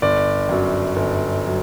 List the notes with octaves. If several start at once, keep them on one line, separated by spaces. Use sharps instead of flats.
G1 D5
F#2 F#3
G1
F#3